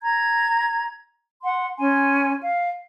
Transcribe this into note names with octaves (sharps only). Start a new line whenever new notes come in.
A#5 G#6
F#5 C6
C#4 G#5 C6
F5